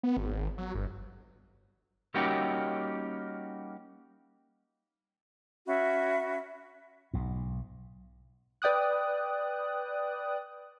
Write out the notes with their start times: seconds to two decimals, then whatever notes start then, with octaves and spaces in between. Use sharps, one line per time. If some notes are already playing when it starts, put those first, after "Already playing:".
0.03 B3
0.17 G#1
0.58 F#3
0.75 G1
2.14 G3 A#3 C#4 D#4 F#4 G4
5.66 C#4 F#4 E5 B5
7.14 B1 G#2
8.62 B4 D5 G5 D#6 F#6